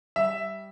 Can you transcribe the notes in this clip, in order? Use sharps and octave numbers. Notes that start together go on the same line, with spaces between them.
G3 E5